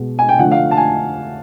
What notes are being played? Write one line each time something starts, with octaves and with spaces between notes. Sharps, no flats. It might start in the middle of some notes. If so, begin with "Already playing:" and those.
Already playing: B2 G#3
G#5
G5
D3 F3 A3 F#5
F5
A5
G#5